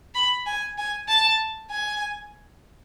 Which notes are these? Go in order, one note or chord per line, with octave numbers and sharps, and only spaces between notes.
B5
G#5
G#5
A5
G#5